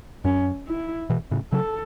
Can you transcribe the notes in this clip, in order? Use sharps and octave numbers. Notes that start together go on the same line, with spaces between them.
F#2 C#4
E4
B2 E3
A2 C#3
C#3 F#3 A4